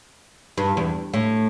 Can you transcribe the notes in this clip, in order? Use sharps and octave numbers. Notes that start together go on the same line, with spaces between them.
G2
E2
A2